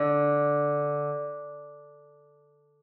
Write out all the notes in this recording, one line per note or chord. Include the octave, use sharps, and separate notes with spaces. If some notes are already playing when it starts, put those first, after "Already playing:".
Already playing: D3